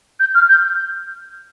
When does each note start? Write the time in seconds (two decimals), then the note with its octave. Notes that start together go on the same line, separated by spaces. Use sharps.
0.20 G6
0.34 F6
0.49 G6